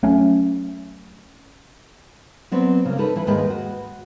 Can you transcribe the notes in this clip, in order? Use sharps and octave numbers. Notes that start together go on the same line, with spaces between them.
F#3 A3 C#4
F#3 B3 C4 D5
C#3 A#3
D#4 A4 B4
E3 E4 B4
D#2 G#2 G#3 B4 G5
F#4